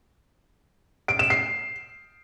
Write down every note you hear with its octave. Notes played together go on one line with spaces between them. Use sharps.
D7
E7
C7